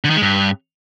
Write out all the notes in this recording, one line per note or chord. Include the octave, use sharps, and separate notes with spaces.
D3
D#3
G#3
G2